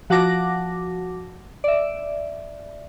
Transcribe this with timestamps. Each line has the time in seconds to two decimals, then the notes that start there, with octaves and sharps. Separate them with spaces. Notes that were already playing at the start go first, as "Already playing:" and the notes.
0.10 F3 F#4 F#5 A5 D6 A#6
1.64 D5 E5